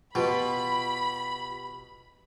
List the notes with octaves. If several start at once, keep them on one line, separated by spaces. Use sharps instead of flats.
B2 F4 G4 G5 B5